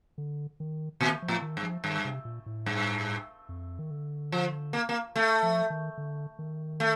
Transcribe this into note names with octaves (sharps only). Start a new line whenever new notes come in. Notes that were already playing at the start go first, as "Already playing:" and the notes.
D3
D#3
A#2 D#3
F3
A2
D#3
G2
F3
G2 D#3
C3
A#2
A2
G2
F2
D#3
D3
F3
A#3
A#3
A3
F3
D#3
D3
D#3
A3